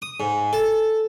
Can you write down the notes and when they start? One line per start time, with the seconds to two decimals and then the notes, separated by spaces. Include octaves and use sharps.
0.02 D#6
0.20 G#2
0.53 A4